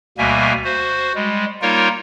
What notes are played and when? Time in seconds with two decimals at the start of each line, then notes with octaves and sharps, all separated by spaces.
0.18 D2 B2 G3 A#3 E5 G#5
0.65 F#4 C5
1.15 G3 G#3
1.62 G3 A#3 D#4 F4 A#4 C#5